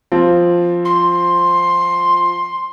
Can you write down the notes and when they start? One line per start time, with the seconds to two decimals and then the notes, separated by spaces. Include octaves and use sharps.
0.12 F3 C4 F4
0.84 C6